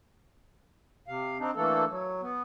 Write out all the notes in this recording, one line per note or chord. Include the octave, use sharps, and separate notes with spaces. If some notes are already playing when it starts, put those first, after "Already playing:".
C3 F5
C4 D4 D#4
E3 A3 A#3 D4 A4
F#3
B3